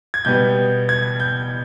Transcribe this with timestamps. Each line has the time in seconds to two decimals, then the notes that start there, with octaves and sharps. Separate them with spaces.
0.14 G#6
0.25 B2 G3 B3 G6
0.89 G#6
1.20 G6